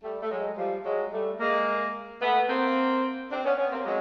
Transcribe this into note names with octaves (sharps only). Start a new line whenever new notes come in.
G3 A3
A3
F#3 G#3
F3 G3
F#3 G#3
G3 A3
G#3 A#3
A3 B3
A#3 C4
C4 D4
B3 C#4
B3 C#4
A#3 C4
F#3 G#3